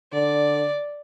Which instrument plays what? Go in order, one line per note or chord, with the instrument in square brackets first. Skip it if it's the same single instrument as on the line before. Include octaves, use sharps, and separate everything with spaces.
[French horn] D3 [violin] D5